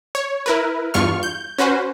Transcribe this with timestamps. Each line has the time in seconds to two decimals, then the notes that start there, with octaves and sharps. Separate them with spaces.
0.15 C#5
0.46 E4 A#4 B4
0.94 E2 G2 F4 C#6 F6
1.23 G6
1.58 C#4 F#4 B4 C5